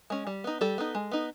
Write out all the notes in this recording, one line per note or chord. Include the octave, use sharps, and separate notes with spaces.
G#3 C#4
G3
B3 D#4
G3 A4
B3 D#4
G#3
B3 D#4